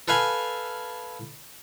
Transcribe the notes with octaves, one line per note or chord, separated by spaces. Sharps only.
A4 B4 F5 G#5 B5